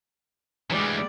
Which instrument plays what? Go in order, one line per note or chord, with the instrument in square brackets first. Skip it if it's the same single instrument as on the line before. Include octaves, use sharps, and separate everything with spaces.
[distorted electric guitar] D2 E3 [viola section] G3 G#3 [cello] D5